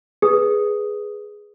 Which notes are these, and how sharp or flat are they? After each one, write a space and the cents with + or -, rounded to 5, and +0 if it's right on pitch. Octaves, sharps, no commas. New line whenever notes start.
G#4 +0 B4 +0 D#6 +0